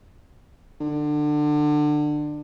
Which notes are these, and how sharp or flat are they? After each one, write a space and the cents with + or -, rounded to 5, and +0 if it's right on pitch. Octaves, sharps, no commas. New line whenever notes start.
D3 +25